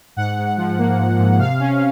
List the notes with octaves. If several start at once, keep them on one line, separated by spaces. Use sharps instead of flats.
G#2 F#5
G#2
F3
A#3
G#2
G#2
C3 F5
C#4